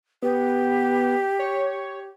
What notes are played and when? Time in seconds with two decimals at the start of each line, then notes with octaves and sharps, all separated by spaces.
0.22 B3 G4
1.39 C#5